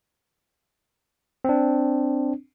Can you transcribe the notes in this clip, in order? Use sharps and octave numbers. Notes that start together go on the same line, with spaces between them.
C4 D4